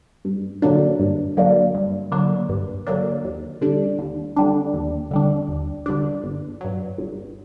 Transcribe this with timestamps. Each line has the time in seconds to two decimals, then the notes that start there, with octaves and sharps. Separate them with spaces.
0.25 G2
0.62 D3 F#3 A#3 D4
1.00 G2
1.37 D3 F#3 A#3 D4
1.75 G2
2.12 D3 F#3 A#3 D4
2.49 G2
2.87 D3 F#3 A#3 D4
3.24 D#2
3.61 D3 G3 D4
3.99 D#2
4.36 D3 G3 D4
4.74 D#2
5.11 D3 G3 D4
5.49 D#2
5.86 D3 G3 D4
6.23 G1
6.61 G2 F#3
6.98 G1